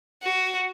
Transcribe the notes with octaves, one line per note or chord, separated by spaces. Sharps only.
F#4